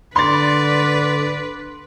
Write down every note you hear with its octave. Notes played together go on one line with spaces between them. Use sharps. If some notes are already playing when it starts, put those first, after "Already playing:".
D3 B4 D5 C6 A6